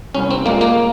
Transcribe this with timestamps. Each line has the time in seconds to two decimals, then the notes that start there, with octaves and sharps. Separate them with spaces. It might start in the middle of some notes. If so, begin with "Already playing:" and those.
0.15 C2 C#4
0.31 C4
0.46 A#2 G#3 A#3
0.61 A#3